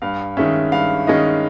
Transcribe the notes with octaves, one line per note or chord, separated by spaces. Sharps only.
G2 F5
D#3 G#3 C#4 E5
G2 F5
D#3 G#3 C#4 D#5